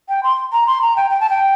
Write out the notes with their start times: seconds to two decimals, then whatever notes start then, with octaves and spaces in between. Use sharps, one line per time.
0.09 G5
0.23 C6
0.52 A#5
0.67 C6
0.82 A#5
0.96 G5
1.11 G5
1.20 A5
1.30 G5